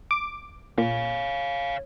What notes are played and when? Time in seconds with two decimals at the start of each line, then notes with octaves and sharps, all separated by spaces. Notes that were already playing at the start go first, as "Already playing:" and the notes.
0.11 D6
0.78 A#2 C#5 F5